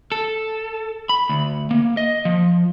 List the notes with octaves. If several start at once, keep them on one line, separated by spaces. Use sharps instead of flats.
A4
B5
D2
A#3
D#5
F3